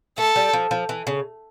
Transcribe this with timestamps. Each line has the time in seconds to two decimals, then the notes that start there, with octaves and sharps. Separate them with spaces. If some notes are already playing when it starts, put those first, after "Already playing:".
0.18 A3 A4
0.36 G3
0.53 F3
0.71 F3
0.89 E3
1.07 C#3